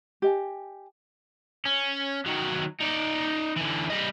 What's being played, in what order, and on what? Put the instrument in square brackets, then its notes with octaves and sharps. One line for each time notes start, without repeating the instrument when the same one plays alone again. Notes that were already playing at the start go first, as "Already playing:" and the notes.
[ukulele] G4 D#5 G#5
[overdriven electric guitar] C#4
D#3 F#3
D#4 D5
D3 E3
G3 D#5